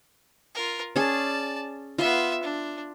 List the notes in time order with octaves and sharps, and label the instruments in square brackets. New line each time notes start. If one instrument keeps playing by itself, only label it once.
[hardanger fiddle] F4 A#4
[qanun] C#4 G#4 [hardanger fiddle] D5 A5
[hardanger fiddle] B3 E5 [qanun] F4 C6
[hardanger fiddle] D4